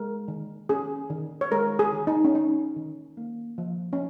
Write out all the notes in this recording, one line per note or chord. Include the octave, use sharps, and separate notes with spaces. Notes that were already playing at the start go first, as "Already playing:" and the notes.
Already playing: G#3 A#4
D#3
C#4 G#4
D#3
C#5
G#3 A#4
G#4
D#3
D#4
C#4
C#4 D#4
D#3
A#3
F3
C#4